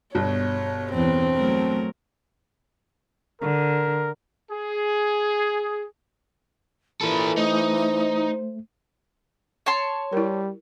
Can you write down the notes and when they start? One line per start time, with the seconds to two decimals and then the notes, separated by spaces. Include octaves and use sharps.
0.15 G1 B2 C#5
0.93 E2 C4
1.35 F#3 A3 A#4
3.42 D3 A#4
4.52 G#4
7.01 A#2 E3 A4 B4
7.37 A3 D#4 C5
9.66 C#5 A5 C6
10.13 G3 E4 A#4